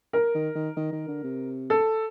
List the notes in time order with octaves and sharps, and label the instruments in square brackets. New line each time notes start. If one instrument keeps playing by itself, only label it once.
[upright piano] A#4
[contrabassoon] D#3
D#3
D#3
D#3
D3
C3
[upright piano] A4